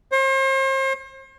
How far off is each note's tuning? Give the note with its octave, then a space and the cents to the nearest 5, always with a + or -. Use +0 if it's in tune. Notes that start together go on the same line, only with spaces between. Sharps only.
C5 +40